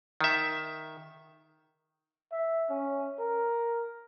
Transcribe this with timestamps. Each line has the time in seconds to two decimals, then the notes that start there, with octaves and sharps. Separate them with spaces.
0.21 D#3 E5
2.32 E5
2.70 C#4
3.19 A#4